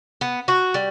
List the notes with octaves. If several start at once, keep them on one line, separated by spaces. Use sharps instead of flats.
B3
F#4
G3